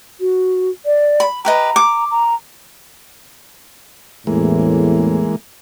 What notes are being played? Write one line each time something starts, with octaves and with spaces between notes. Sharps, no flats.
F#4
D5
B5
G4 B4 D#5 A#5
D6
A#5
A1 E2 A2 E3 G#3 A#3